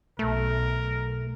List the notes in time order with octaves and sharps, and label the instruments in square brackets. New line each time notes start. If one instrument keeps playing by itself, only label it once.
[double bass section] B1 [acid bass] A3 [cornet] A#4